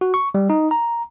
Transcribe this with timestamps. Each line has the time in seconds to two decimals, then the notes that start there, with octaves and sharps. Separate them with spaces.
0.01 F#4
0.14 C#6
0.35 G3
0.50 D#4
0.71 A#5